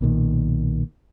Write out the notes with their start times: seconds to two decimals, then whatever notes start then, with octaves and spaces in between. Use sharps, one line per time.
0.01 B1 A#2 D3 D#3